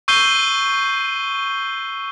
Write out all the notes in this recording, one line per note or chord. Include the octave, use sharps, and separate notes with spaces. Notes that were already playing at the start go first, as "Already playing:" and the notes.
C#6 E6 G6 C7 D#7 G7